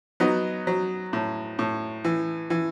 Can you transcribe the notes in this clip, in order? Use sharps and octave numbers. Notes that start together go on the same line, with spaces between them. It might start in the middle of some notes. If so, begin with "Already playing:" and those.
F#3 B3 D#4
F#3
A2
A2
E3
E3